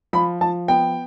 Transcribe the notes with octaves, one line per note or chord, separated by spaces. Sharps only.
F3 B5
F3 A5
B3 G5